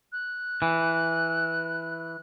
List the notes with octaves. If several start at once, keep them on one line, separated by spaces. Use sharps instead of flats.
F#6
E3